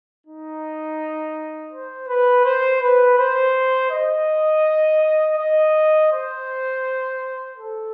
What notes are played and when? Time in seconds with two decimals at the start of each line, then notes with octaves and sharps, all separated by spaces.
0.25 D#4
1.70 C5
2.08 B4
2.45 C5
2.81 B4
3.18 C5
3.91 D#5
5.38 D#5
6.11 C5
7.58 A4